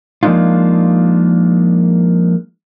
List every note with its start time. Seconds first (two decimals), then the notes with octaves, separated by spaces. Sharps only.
0.23 F3 G#3 A#3 D4 D#4 F4